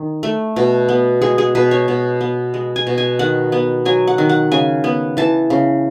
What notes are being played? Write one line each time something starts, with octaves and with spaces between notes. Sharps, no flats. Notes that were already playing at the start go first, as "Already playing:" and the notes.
Already playing: D#3
A3
B2
B3
G#3 G#4
G#4
B2 B4
C#5
B2
B3
G#3
G#5
B2
G#5
D#3 F#5
B3
F#3 G#5
F#5
D#3
F#5
C#3 G#5
B3
E3 A5
C#3